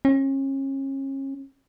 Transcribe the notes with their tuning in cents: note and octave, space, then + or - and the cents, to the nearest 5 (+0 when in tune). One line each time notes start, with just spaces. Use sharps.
C#4 -35